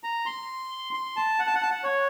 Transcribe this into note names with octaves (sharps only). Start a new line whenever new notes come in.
A#5
C6
C6
A5
F#5
A5
F#5
A5
F#5
C#5